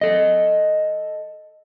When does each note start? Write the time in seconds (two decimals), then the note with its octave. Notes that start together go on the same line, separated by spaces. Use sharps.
0.01 A4 D#5